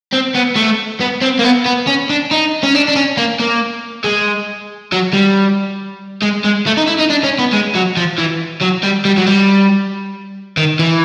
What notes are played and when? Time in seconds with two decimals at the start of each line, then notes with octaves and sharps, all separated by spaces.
0.13 C4
0.35 B3
0.56 A3
1.01 B3
1.22 C4
1.39 A#3
1.44 B3
1.66 B3
1.87 C#4
2.10 D4
2.31 D#4
2.63 C#4
2.75 D4
2.88 D4
2.96 C#4
3.17 A#3
3.40 A#3
4.04 G#3
4.92 F#3
5.13 G3
6.22 G#3
6.44 G#3
6.66 A3
6.77 D#4
6.87 E4
6.99 D#4
7.10 D4
7.23 C#4
7.39 B3
7.53 G#3
7.75 F#3
7.97 F3
8.18 E3
8.62 F#3
8.83 G3
9.05 G3
9.17 F#3
9.27 G3
10.57 D#3
10.79 E3